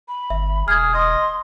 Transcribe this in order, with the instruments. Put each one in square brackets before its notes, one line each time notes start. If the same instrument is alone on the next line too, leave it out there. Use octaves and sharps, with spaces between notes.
[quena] B5
[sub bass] G1 [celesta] E5
[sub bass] E1 [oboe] G#4 [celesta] F6 G#6
[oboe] D#5 [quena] C6